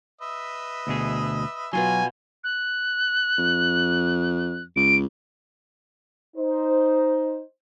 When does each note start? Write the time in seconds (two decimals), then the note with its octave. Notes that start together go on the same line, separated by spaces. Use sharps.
0.21 B4 D#5 E5
0.87 D2 B2 G#4
1.73 B2 F#3 F4 G#5 C6
2.44 F#6
3.38 F2
4.76 C#2 D7
6.36 D#4 C5